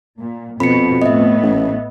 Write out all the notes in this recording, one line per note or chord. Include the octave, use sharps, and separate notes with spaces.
A#2
F2 B2 B5 C#7
A2 B3 D#5 E5
A1